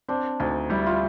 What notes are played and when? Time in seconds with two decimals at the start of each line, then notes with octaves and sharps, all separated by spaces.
0.08 C4 D4
0.40 D2 D#4
0.70 G3 E4
0.86 F4